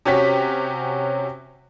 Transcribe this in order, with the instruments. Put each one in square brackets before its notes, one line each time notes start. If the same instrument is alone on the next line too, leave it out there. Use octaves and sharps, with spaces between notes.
[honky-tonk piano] C3 C#4 F#4 G4 C#5 B6